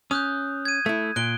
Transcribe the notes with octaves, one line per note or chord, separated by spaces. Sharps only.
C#4 D#6 F#6 G6
G#6 D#7
A3 E4
A#2 F#6 D7 G7